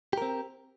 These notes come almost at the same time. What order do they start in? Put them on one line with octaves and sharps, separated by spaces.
G4 A#4 C4